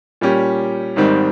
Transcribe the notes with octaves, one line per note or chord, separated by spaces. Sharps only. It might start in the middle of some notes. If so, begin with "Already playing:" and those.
A#2 G3 C#4 G4
G#1 G#2 D#3 G3 C4